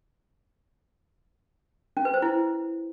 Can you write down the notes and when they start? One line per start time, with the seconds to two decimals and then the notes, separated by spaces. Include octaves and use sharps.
1.97 C#4
2.05 B4
2.14 C5
2.22 E4